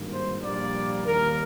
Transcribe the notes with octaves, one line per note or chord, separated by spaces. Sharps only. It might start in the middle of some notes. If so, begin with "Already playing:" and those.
Already playing: G#1 G2 D#3 A#3
C5
A#1 A#2 G3 A#3 D5
D#2 D#3 G3 A#3 A#4